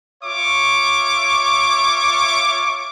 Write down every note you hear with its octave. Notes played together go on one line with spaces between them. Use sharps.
F4 C#5 E5 C#6 D6